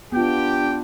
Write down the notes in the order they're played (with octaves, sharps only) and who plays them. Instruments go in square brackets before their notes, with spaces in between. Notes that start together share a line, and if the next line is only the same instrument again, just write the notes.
[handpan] B3 F4 [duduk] D4 [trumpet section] G4 G5